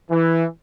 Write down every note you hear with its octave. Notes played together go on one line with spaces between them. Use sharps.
E3